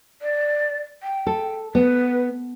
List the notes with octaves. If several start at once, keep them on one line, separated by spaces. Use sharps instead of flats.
D5
G5
A4
B3 B4